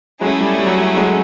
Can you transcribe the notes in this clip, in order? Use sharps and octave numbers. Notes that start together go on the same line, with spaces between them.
F#3 G#3 A3 C#4 E4 G#4
G3
G3
F#3
G3
F#3 G#3